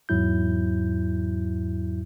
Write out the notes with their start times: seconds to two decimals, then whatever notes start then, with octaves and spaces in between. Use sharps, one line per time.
0.09 E2 G#2 F#3 E4 G6